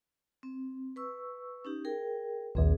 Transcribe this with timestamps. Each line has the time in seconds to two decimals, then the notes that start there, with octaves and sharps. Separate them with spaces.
0.43 C4
0.96 B4 C#6 E6
1.65 C#4 D#4 G4
1.85 G#4 A#4 G5
2.55 A#1 D#2 C4 G#4